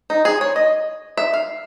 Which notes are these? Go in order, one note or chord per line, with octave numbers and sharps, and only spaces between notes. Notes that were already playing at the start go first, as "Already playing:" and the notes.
D#4
G#4
C#5
D#5
E5
F5